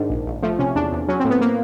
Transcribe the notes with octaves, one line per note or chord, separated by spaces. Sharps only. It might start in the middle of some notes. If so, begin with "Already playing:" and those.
Already playing: G#2 D#3 D4
A#1
A#1
F3 A3
C3 C#4
E2 D4
E2
F#3 C#4
C4
A2
B3
A#3